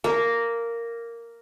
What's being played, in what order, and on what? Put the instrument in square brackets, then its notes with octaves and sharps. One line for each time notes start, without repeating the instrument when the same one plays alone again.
[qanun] A#3